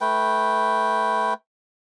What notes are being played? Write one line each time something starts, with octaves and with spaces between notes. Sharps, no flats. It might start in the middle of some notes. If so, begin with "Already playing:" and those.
A3 B4 G5